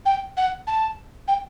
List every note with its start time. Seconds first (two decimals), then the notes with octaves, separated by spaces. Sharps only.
0.05 G5
0.37 F#5
0.67 A5
1.28 G5